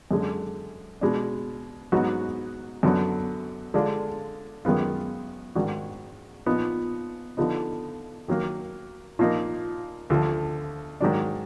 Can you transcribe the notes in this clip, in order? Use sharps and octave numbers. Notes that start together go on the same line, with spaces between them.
F#2 D3 G#3
B2 G#3 B3 D4
G#2 F#3 B3 D#4 F#4
F#2 D3 F#3 B3
D3 G#3 D4 F4
F#2 D#3 G#3 B3 F4
G#2 D#3 G#3 D4 F#4
A#2 F3 B3 D#4
D3 F3 B3 D#4
D#3 F#3 A#3
A#2 F3 A#3 D#4
D2 D3 F3
G#2 D#3 F#3 D4